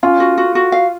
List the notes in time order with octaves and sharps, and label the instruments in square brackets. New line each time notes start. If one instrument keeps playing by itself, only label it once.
[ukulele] C#4 [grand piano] F4
[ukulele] F#4
F#4
F#4
F5